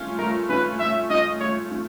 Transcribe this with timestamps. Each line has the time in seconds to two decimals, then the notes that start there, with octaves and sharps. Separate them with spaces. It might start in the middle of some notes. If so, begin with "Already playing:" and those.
Already playing: A3 C#4 F4
0.18 A3 A#4
0.49 C#4 F4 B4
0.79 A3 E5
1.10 C#4 F4 D#5
1.40 A3 C#5
1.71 C#4 F4